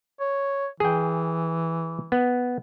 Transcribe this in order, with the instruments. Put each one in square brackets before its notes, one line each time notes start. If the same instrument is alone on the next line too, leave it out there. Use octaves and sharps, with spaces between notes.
[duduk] C#5
[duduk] E3 [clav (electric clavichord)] G#4 G5
[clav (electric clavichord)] B3